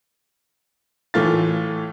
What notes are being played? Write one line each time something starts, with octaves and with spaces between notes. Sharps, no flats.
A2 E3 A3 F4 A6